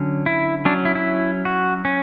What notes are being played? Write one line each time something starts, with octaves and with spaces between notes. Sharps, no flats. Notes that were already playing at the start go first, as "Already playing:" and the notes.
Already playing: D3 F#3 C#4
E4
F#3 C#4 D4
E4
E4
F#4
C#4